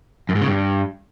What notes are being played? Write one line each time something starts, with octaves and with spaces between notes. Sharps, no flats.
F#2
G#2
C#3
G2